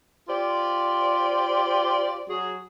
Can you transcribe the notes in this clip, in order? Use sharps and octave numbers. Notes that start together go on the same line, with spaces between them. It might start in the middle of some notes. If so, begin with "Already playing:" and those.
F4 G4 C5 D5
F#3 F#4 G#4